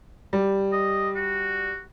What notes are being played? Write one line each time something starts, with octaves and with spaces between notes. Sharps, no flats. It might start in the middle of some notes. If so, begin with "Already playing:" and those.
G3
D#5
F#4